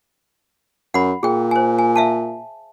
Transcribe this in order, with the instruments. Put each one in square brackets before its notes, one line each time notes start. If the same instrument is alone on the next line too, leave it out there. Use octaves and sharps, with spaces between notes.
[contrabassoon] F#2 [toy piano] F#5 B5
[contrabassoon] A#2 [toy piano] G#4 G5
[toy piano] C5 G#5
G#5
E5 F5 A5